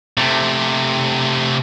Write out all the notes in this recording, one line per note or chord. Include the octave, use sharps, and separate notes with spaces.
C3 A3